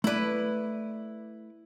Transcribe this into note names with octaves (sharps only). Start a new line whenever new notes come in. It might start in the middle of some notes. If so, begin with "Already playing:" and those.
A3 E4 B4 D5